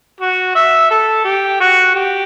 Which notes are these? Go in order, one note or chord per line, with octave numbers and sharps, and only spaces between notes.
F#4
E5
A4
G4
F#4
G4